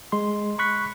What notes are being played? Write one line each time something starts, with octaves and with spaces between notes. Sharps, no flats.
G#3 C6
B5 C#6 F#6 B6